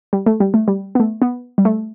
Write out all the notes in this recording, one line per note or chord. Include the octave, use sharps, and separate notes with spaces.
G3
A3
G3
A3
G3
B3
A3
B3
G3
A3